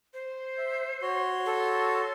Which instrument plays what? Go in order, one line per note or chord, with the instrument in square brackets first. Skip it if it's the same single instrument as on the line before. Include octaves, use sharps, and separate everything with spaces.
[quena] C5
[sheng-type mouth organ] E5
F#4 C#5 C6
[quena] A4